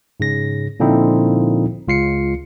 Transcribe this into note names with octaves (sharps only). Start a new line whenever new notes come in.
G#2 C#3 A#6
A#2 D3 F3 C4 D#4 E4
C#2 F4 C7 C#7